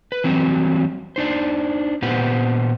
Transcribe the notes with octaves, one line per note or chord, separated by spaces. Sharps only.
B4
E3 F#3 G3 C4 F#4
D4 D#4 C5
A#2 B3 G4 B4 C5 F#5